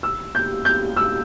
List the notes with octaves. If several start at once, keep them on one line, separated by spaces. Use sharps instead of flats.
E6
G6
G6
E6